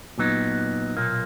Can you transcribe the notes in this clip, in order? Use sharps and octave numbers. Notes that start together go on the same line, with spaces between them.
A#2 F#3 B3 D#4
B1 A#2 A#3